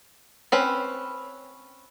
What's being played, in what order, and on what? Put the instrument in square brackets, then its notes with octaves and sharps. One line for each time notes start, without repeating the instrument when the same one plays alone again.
[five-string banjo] C4 C#4 B4